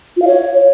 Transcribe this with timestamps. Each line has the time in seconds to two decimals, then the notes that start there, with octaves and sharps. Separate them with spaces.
0.17 F4
0.22 F5
0.27 C#5